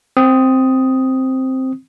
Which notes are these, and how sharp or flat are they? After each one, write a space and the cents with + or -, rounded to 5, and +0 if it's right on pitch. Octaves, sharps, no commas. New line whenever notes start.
C4 +0 D#6 +5